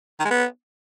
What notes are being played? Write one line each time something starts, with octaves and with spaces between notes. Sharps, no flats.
D#3
G#3
B3